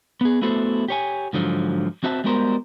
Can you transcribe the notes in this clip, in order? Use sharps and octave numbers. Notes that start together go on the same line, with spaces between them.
B3 G#4
A3 B3 E4 F#4 A4 C5
G4 C#5 G#5
G#2 D3 F3 F#3
C4 F#4 C5 E5 A5
G3 G#3 B3 F#4 A#4 C5